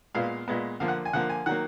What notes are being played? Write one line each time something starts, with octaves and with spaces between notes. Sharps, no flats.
A#2 G#3 B3 F5
A#2 G#3 B3
D3 F3 A#3 F5
F#5
G#5
D3 F3 A#3 F#5
G#5
D#3 F#3 A#3 F#5